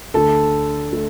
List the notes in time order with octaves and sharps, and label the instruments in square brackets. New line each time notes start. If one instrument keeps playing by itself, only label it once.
[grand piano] D2 D3 A3 A4 A5
A3